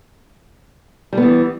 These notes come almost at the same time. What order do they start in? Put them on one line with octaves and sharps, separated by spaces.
G3 B3 E3